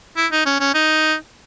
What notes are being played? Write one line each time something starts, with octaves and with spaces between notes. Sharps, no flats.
E4
D#4
C#4
C#4
D#4